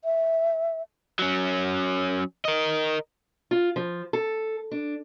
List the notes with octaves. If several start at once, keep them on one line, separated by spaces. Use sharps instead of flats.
E5
F#3 C#4
A#4 D#5
F4
F3
A4
D4